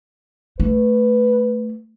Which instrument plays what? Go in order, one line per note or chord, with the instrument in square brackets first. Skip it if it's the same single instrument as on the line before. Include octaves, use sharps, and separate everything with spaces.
[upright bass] A3 [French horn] B4